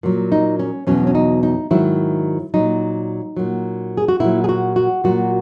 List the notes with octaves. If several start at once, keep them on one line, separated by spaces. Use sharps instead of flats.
A#2 F#3
D#4
C#4
E2 B2 F#3 C#4
C#4
D#4
D#4
G#2 D#3 F#3 E4
A#2 F#3 D#4
A#2 F#3
G#4
F#4
A#2 F#3 E4
G#4
F#4
F#4
A#2 F#3 F#4